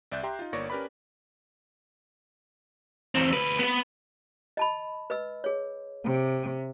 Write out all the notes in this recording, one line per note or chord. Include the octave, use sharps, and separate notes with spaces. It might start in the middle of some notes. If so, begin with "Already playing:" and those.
C2 D5 E5 F#6 G6
G4 E5 G5 A#5 C6
D#4 F4
G1 A#3 C#5 D5 C#6 A#6
C#4 G4 A#4 B4 D5 B5
E2 C4
D2 B4
B3 B4
D#5 A5 B5
B4 D#5 E6
G#4 C#5
C3